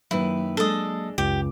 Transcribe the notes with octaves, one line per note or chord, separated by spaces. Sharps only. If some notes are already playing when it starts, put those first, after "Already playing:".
F#2 D#3 F#3 A#3 E4 B4
G#3 D4 A4 D#5
C#2 F#2 G4